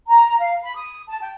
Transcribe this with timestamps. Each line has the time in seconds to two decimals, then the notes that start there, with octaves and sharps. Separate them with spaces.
0.08 A#5
0.39 F5
0.63 B5
0.76 D#6
1.08 A5
1.22 G5